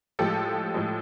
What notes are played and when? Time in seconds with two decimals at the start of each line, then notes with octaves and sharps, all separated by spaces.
0.19 A2 F3 G#3 G4 A4
0.74 A2 F3 G#3